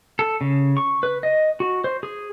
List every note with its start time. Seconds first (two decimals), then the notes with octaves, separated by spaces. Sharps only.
0.19 A4
0.41 C#3
0.77 C#6
1.03 B4
1.23 D#5
1.60 F#4
1.84 C5
2.03 G#4